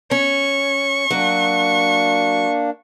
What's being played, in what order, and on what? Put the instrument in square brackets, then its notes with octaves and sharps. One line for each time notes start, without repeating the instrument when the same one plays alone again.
[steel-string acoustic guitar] C#4 [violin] C#6
[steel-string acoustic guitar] F#3 [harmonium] A#3 D4